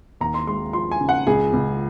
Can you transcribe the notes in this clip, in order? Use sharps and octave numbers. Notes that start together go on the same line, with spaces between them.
D#2 A#5
C6
G#3 C6
F3 C6
G#5
C#3
F#5
C#2 G#4
C#2